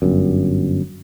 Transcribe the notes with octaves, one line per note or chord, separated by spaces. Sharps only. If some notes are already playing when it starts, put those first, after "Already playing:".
G1 F#2